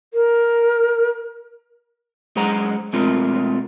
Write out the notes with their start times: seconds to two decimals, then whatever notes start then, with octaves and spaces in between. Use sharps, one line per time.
0.14 A#4
2.36 F#2 G#3 G#4 C5 F#5 A#5
2.93 B2 G#3 A3 C4 F4 A#4